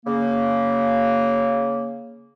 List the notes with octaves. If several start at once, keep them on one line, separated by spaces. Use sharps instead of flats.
C#3 A#3